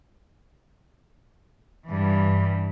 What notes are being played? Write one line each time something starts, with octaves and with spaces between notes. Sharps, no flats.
G2 E3